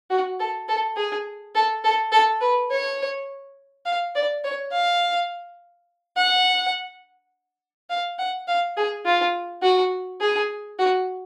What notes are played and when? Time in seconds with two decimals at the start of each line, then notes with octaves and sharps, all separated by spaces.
0.10 F#4
0.40 A4
0.68 A4
0.96 G#4
1.55 A4
1.84 A4
2.12 A4
2.41 B4
2.70 C#5
3.86 F5
4.15 D5
4.44 C#5
4.72 F5
6.17 F#5
7.90 F5
8.19 F#5
8.48 F5
8.77 G#4
9.05 F4
9.62 F#4
10.21 G#4
10.79 F#4